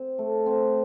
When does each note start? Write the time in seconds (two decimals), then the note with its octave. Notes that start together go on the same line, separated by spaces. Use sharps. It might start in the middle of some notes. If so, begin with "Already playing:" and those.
Already playing: C4
0.19 A3
0.46 C4